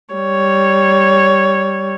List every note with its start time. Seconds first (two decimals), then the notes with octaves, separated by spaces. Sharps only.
0.14 G3 C#5